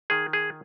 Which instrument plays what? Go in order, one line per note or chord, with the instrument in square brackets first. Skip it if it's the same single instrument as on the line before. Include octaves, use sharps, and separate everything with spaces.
[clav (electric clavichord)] D#3 G#4
G#4